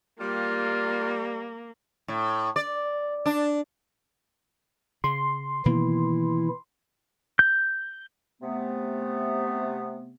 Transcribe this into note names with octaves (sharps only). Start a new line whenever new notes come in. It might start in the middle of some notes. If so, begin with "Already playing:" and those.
G3 A#3 F4
A2
D5
D4
C#3 C6
B2 D#3 E3 A#3 E4
G6
C3 A3 B3